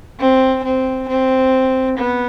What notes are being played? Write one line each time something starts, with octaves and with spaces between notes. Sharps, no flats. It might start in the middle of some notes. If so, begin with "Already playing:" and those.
C4
C4
C4
B3